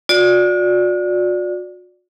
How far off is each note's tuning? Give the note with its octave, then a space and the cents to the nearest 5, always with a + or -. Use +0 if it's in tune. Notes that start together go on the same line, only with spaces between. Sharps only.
F#4 -45 D5 +0